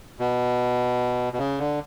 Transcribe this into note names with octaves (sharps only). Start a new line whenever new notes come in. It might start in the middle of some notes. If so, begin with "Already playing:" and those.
B2
B2
C#3
D3